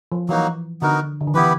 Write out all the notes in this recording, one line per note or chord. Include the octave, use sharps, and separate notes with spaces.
F3
E3 F#3 A#3 D#4 F#4
D3 B3 D#4 F#4 A#4
D3
D#3
E3 B3 E4 G4 B4